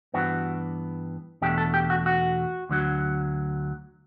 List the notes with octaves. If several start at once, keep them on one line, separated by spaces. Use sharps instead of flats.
G2 E3 B3 D4 F#4
E2 B2 A3 D4 G4
A4
G4
F#4
F#4
D2 D3 F#3